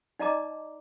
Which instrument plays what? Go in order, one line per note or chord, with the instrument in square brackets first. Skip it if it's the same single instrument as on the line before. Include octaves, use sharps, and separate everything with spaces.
[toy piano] D#4 D5 D#5 A5 A#5 D6